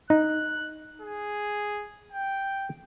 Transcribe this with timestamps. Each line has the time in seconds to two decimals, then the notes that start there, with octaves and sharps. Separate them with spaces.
0.10 D#4 F#6
1.02 G#4
2.13 G5